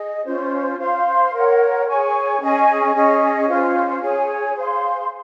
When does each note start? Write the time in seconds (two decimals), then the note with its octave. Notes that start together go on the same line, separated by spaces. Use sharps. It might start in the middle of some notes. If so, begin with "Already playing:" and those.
Already playing: G#4 D#5
0.26 C#4 F4 C5
0.79 C5 F5 C6
1.33 A#4 C#5 F#5
1.87 G#4 C#5 G#5 C#6
2.40 C#4 G#4 D#5 G#5
2.94 C#4 G#4 D#5
3.48 C#4 F4 C5
4.01 G#4 C#5 G#5
4.54 G#4 C5 F5 C6